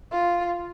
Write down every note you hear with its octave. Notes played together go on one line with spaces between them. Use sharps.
F4